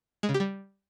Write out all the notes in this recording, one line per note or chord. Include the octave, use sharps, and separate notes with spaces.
G#3
C#3
G4
G3